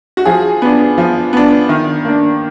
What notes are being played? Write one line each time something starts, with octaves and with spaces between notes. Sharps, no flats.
F#4
F3 G#4
B3 D4
F3
B3 D4
D#3
A#3 D4